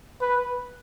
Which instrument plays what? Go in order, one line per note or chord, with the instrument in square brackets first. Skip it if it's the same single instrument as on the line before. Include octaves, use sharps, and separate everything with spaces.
[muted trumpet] B4